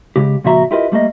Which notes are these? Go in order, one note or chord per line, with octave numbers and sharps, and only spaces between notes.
C#3 G#3 G4
C#2 A#2 F3 F#4 E5 A#5
E4 F4 G4 A#4 B4 D#5
G3 A3 A#3 D#5